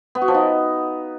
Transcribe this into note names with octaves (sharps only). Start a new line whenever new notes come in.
B3
F#4
F3
D#4